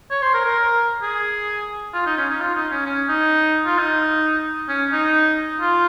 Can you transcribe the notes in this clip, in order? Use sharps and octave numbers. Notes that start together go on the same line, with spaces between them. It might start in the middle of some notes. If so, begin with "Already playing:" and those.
C#5
C5
A#4
A#4
G#4
F4
D#4
C#4
D#4
F4
D#4
C#4
C#4
D#4
F4
D#4
C#4
D#4
F4